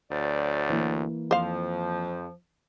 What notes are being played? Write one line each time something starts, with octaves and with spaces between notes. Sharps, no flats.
D2 F#3 C5 D5
E3 A#3
F2 F3 C5 F5